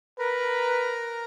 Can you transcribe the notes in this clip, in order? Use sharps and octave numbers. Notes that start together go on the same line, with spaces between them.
A#4 B4 A#5